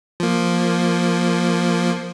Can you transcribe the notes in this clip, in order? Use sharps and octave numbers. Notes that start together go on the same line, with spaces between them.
F3 A#3